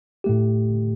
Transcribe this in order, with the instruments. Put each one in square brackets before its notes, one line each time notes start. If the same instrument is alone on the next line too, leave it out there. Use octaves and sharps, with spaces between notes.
[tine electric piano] A2 A3 G4